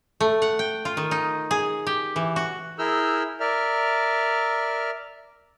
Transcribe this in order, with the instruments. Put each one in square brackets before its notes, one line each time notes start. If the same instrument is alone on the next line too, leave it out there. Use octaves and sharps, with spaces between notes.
[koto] A3
F#5
G5
F4
D#3
D#4
G#4
G4
E3
F#4
[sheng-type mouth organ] E4 G#4 A#4 E6 F6 G6
A#4 D5 E5 F6